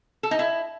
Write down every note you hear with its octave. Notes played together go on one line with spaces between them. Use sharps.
A4
D#4
E4